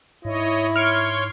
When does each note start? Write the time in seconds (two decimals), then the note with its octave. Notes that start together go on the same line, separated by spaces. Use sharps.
0.25 G#2 E4 C#5 D#5
0.76 C#5 C6 F6 G#6 C#7 D7